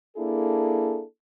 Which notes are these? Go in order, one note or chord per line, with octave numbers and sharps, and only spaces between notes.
A#3 D4 E4 G#4 A4